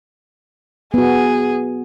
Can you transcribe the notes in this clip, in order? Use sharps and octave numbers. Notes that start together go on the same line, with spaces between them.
B3 F#4 G#4